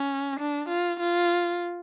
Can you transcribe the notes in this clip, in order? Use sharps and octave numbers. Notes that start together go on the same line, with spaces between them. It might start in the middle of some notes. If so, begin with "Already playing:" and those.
Already playing: C#4
D4
F4
F4